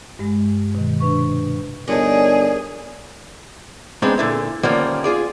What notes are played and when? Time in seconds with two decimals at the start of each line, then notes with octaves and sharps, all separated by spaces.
0.19 G2 G#3
0.75 B2 D#3
1.00 C3 D4 B4 C#6
1.88 G1 D#4 G#4 A#4 C#5 D5 A5
4.02 G#3 B3 C4 D4 D#4
4.18 A#2 D3 E4
4.63 D3 D#3 F3 G3 A#3 C#4
5.04 F4 G#4 D5